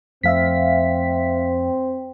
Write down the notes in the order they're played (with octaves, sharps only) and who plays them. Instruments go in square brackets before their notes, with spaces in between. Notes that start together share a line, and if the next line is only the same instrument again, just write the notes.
[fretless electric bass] F2 F3 A3 [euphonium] C4 [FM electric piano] E5 F5 B6